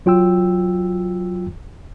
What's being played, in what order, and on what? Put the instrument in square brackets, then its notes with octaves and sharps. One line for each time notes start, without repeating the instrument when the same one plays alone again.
[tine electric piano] F#3 F4 G5 E6